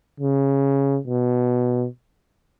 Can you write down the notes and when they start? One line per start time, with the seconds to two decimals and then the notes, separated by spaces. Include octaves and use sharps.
0.20 C#3
1.07 B2